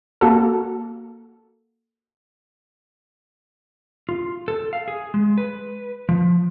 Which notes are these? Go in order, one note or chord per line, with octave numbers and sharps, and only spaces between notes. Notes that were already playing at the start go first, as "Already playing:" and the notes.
A#3 F#4 A4
F4
A4
F5
G#4
G#3
B4
F3